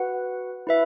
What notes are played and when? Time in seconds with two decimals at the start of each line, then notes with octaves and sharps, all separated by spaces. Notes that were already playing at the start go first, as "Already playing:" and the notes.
Already playing: F#4 B4 F#5
0.67 E4 B4 E5